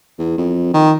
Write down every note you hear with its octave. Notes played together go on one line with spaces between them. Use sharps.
E2
F2
D#3